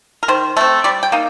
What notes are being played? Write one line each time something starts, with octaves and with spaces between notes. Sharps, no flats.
A#4
D#3 C5
A3 C4
G3 D5
G5
A#3 D#4